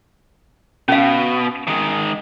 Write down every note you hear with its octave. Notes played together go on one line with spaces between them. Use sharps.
B2 C#4 F5
D#3 G#3